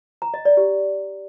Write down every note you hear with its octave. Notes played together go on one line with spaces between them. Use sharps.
A#5
D#5
D5
G4